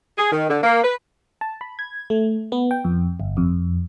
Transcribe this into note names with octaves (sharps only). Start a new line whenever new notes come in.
G#4
D#3
D3
A#3
B4
A5
B5
G#6
A3
B3
G5
F2
G1
F2